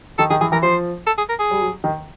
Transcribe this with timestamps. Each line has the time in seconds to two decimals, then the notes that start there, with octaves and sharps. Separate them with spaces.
0.18 D#3 A4
0.30 D#3 G#4
0.41 E3 G#4
0.52 E3 A#4
0.62 F3 C5
1.07 A4
1.18 G#4
1.29 A#4
1.40 G#4
1.51 G3
1.61 F#3
1.84 D#3